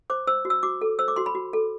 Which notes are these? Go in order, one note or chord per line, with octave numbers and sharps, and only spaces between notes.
C5 D6
C5 E6
F#4
E6
F#4 D6
A4
C5 E6
D6
F#4 C6
B5
F#4
A4